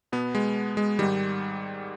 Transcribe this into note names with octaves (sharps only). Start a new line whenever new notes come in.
B2 B3
G#3
G#3
G#2 D#3 G3